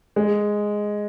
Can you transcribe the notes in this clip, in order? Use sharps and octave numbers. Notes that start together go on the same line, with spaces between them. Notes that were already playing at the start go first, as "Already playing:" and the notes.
G#3